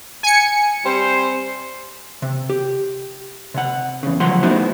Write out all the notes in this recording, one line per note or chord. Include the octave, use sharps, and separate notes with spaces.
G#5 C#7
G3 C4 C5
C3
G4
C3 F#5
E2 C#3
D2 F3 F#3 F#5 C6
A3 B3 D#4 E4 F#4 C5